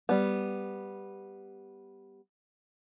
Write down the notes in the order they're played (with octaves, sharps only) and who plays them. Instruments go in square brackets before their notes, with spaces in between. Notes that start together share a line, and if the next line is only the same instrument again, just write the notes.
[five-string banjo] G3 B3